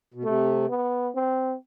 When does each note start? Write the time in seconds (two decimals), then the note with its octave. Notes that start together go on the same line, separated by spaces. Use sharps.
0.14 B2
0.24 C3 A3
0.69 B3
1.15 C4